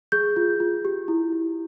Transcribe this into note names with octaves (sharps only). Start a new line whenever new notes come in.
G#4 G6
F4
F4
G4
E4
E4